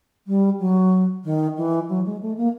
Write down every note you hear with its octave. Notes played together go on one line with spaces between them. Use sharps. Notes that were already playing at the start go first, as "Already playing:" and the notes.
G3
F#3
D#3
E3
F#3
G#3
A3
A#3